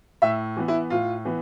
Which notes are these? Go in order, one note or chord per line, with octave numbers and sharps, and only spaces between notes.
A2 E5
E3 B3
E4
A2 F4
E3 B3